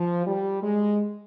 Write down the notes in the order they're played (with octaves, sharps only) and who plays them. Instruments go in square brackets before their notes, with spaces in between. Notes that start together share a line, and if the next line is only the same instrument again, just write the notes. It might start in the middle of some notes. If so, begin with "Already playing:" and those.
Already playing: [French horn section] F3
G3
G#3